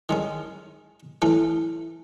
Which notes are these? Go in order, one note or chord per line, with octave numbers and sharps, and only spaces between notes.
D#3 G#3 C#4
E3 A3 C#4